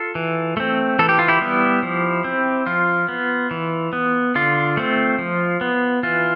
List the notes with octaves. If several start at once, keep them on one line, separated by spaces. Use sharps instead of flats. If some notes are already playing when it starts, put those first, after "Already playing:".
Already playing: F4 A4
E3
A3 C4
E3 A4
G4
F4
E4 G4
G3 B3
F3
C4
F3 F4
B3
E3
B3
D3 F4
A3 C4
F3
B3
E3 F4